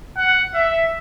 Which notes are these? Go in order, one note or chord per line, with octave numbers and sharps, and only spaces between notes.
F#5
E5